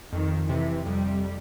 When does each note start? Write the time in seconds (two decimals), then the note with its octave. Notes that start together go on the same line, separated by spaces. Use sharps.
0.12 F2 D#3
0.49 C3 E3
0.86 F2 G3